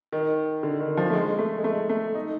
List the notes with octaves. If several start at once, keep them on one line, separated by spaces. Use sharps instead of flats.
D#3
D3
D#3
F3
A3
G#3
A3
G#3
A3
A3
D#4